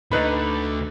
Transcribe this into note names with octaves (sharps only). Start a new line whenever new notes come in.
D2 D3 D#4 B4 B5